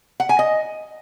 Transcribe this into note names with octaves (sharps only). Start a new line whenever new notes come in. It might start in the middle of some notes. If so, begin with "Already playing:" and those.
F#5
G#5
D#5